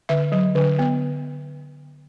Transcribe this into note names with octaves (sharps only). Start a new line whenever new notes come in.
D3 E5
F#3
D3
B3